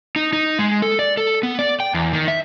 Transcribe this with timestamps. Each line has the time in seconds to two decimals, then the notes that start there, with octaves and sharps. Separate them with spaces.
0.16 D#4
0.33 D#4
0.59 G#3
0.82 A4
0.99 D5
1.17 A4
1.43 B3
1.59 D5
1.80 G5
1.94 E2
2.13 D#3
2.28 E5